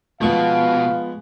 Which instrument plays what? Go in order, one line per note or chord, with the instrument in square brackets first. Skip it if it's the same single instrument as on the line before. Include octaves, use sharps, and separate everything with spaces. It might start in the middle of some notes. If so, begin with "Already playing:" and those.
[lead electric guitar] B2 [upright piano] F3 B3 [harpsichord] G#3 C#6 [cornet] F5